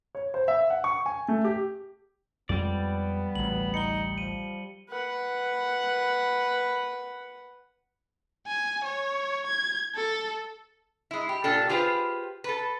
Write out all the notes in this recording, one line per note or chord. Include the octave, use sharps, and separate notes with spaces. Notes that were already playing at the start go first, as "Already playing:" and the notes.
C#5
C5
E5
F#5
C#6
G#5
A3
G4
F2 G3 G#3 B3 D5
A1 D2 F#7
D#4 C#7 G7
F3 D#7
B4 F#5
G#5
C#5
G#6
A4
G#3 E4
G4
A#2 D4 G4 A4
F4 G4 G#4 B4 C5 F5
A4 B4